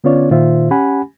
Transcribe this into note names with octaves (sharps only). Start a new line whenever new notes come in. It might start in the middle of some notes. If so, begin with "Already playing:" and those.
D3 B3 C#4 F4 C#5 D5
A#2 D#3 F4 C5 E5
C#4 G4 F#5 G#5 B5